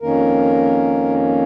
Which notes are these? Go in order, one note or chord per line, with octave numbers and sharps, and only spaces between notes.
F2 D#3 A#3 C#4 A#4